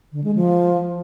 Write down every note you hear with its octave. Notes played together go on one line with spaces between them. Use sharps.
D3
G#3
F3